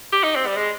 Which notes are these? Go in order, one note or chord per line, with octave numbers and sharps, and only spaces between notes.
G4
D#4
C4
G3
G#3